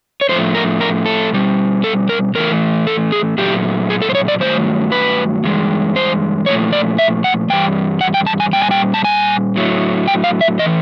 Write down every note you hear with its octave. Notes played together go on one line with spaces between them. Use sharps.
C#5
A2 F3 A3 C5
A#4
A#4
A4
B2 G3
A4
A#4
A2 E3 A3 A#4
A4
G#4
A#2 F#3 A3 G4
G#4
A4
C5
C#5
D5
G2 D#3 F#3 A3 C5
B4
G2 E3 G#3
C5
A#2 F3 A3 C#5
D5
E5
F#5
G2 E3 G3 G5
F#5
G5
A5
G#5
A#2 G3 G5
G#5
G5
A5
G#5
A2 F#3 A3
G5
F5
E5
E3 A3 D#5